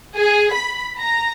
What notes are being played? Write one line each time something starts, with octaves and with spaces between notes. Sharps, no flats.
G#4
B5
A#5